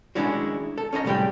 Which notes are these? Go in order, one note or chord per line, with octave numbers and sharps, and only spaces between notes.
D#3 G#3 C#4 D4 E4 F#4
A4
C#4 D#4 E4 D#5
C2 F2 A2 G3 G#3 G5